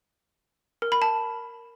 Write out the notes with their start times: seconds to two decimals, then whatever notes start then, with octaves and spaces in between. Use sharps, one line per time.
0.82 A#4
0.92 B5
1.02 A5